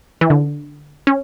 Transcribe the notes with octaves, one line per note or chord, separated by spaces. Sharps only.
E3
D3
C#4